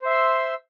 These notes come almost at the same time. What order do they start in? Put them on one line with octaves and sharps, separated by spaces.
C5 E5 C6 E6